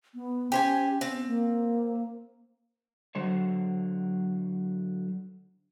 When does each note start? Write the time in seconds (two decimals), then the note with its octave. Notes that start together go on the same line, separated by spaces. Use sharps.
0.15 B3
0.52 C#4 G4 C5 G#5
1.01 B3 C4
1.27 A#3
3.15 D3 F#3 C5 C#5